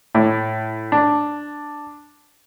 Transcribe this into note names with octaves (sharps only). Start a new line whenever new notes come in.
A2
D4